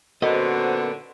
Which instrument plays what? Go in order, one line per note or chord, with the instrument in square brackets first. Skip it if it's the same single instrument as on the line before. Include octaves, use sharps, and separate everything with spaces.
[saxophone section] F#2 A#2 D3 [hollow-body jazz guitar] B3 D#5 [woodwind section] F#4 C5